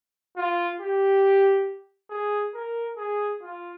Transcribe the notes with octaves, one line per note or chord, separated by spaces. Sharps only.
F4
G4
G#4
A#4
G#4
F4